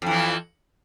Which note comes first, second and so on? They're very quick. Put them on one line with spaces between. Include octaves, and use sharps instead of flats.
F2 E3 F3